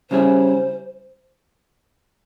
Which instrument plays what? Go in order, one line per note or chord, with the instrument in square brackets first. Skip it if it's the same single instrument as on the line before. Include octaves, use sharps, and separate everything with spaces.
[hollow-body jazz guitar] C#3 G3 C#4 E4 G#4 [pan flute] C5